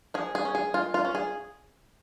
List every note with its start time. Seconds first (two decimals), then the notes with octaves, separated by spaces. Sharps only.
0.14 F3 G#4
0.35 G#4
0.45 C#4
0.55 G#4
0.74 G#3 F4
0.94 F4
1.05 C#4
1.15 G#4